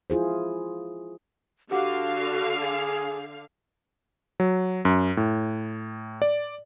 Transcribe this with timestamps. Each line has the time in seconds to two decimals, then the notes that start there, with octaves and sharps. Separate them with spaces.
0.10 E4 F4 G#4 C5
1.71 D3 F#4 G4 F5 F#5 D6
2.61 G#4
4.40 F#3
4.85 F#2
5.17 A2
6.22 D5